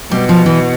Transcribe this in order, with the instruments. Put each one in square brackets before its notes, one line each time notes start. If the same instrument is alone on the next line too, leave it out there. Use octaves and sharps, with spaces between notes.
[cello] B2 [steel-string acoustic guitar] G3
[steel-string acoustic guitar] F3
E3